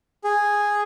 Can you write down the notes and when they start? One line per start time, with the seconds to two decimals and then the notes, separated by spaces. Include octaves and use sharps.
0.24 G#4